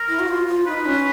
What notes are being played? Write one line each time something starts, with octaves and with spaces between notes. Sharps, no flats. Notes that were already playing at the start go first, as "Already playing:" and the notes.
Already playing: A#4
E4
F#4
F4
F4
D#4 B4
C#4